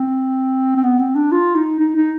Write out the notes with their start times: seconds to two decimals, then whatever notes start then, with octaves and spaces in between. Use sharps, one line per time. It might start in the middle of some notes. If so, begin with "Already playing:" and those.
Already playing: C4
0.76 C4
0.83 B3
0.99 C4
1.16 D4
1.32 F4
1.56 D#4
1.80 D#4
1.96 D#4